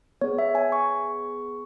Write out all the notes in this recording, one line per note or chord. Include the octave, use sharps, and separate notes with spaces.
B3 G#4 C#5
E5
G#5
C#6